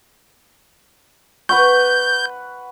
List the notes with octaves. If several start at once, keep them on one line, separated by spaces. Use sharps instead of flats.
B4 F#5 C#6 G6